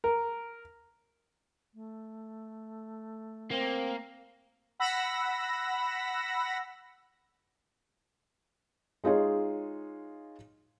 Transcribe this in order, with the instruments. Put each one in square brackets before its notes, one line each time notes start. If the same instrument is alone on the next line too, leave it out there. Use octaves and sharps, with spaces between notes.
[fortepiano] A#4
[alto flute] A3
[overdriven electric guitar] A#3 [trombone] C4
[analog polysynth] F#5 B5 E6 A#6
[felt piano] G#3 D#4 F4 G#4 C#5